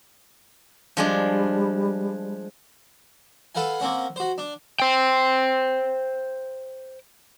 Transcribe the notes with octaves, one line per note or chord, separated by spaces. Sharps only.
F3 G3 G#3 D4
A4 B4 F5 F#5 G#5
A#3 C4 C#4 F#5
F#4 C5
D4
C5 G5